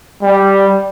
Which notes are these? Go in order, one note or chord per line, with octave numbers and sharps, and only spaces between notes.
G3